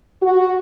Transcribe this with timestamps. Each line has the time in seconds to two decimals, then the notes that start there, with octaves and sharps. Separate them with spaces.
0.22 F#4